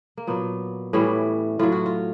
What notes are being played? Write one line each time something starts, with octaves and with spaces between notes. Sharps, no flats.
A#3
A#2 F#3 B3
A2 E3 G3 C#4
A2 F#3 F4
F#4
F4